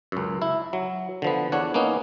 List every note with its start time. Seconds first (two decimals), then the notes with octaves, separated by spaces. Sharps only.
0.12 C#2 F#2
0.42 E4
0.73 F#3
1.22 D3 F3 B3
1.52 E2 D4 C#5 F#5
1.74 A#3 B3 C#4 D#4